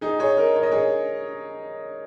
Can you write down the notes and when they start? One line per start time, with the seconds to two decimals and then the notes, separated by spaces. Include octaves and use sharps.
0.01 D#4 G#4
0.19 G#4 C#5
0.37 A#4 D#5
0.56 C#5
0.63 D#5
0.72 G#4 C#5